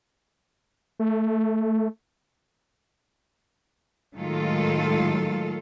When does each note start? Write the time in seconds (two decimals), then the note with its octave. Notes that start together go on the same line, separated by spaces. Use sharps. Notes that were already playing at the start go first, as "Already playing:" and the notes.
0.99 A3
4.15 A2 D#3 F#3 G#3 F4 A4